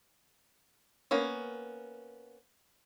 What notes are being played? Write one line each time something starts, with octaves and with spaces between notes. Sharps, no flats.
A#3 B3 C#4